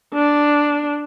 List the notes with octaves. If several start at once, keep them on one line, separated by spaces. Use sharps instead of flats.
D4